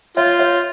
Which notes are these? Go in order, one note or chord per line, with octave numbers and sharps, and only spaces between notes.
F4 C#5 E5
C#5 E5